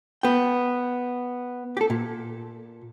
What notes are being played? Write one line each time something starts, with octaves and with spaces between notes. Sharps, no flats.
B3 G5
G4 A4
A#2